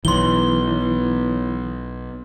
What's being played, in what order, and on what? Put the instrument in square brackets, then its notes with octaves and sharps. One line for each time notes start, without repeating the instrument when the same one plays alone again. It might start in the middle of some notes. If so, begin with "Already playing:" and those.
[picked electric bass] B1 [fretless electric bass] E3 [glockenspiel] C6 G7